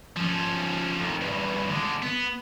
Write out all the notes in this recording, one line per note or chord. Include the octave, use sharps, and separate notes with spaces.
F3 C#4
F2 D#3
E2 G2
D3 G#3
B3